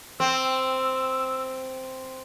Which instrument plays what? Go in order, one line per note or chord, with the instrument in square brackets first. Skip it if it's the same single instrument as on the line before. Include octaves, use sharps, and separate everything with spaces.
[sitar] C4 [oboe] E6